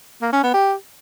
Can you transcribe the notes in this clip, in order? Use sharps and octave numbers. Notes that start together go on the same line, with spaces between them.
A#3
C#4
B3
G4